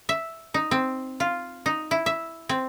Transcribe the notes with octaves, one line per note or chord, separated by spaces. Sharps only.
E5
D#4
C4
F4
D#4
E4
E5
C4